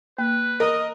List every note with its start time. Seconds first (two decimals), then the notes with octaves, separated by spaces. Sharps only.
0.18 A#3 B4
0.60 A#4 D#5